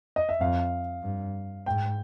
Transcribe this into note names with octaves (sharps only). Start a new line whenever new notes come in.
D#5
E5
F2 F5
G2
G#2 G5